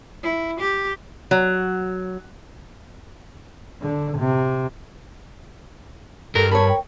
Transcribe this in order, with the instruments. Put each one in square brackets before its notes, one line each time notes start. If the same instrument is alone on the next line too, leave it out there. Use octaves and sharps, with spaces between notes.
[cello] E4
G4
[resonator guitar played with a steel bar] F#3
[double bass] D3
C3
[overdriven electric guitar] G2 [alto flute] A4 [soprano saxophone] A#4
[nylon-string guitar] A#4 C#5 [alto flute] A5 [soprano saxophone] B5
[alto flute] G5